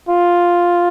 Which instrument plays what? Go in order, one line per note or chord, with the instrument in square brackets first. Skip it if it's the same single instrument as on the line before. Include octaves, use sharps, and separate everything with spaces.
[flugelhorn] F4